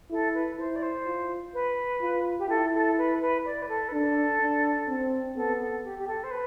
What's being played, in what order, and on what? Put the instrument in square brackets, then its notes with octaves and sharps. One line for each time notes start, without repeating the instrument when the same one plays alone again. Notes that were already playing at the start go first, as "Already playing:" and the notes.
[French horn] E4 [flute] A4
[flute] B4
[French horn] E4 [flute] C5
[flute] D5
C5
[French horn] F4
[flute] B4
[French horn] F4
[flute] G4
[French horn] E4 [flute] A4
[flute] A4
B4
B4
D5
B4
A4
B4
[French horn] D4 [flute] A4
[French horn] D4
C4
[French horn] B3 [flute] A4
[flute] A4
G4
G4
A4
C5
B4